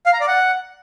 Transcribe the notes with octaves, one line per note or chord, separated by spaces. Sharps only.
F5
A#5
D5
F#5